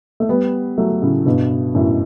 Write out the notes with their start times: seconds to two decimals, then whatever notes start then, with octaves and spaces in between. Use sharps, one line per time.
0.20 A3
0.29 G3 B3
0.78 F#3 A3
1.02 A2 C#3
1.26 G2 B2
1.75 F#2 A2